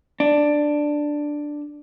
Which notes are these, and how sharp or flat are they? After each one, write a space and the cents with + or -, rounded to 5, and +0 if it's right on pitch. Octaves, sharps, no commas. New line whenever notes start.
D4 +5